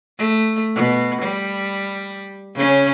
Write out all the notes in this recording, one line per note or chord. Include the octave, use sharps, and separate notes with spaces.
A3
B2
G3
C#3 C#4